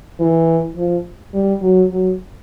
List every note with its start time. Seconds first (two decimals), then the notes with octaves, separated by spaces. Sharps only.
0.19 E3
0.76 F3
1.34 G3
1.62 F#3
1.91 F#3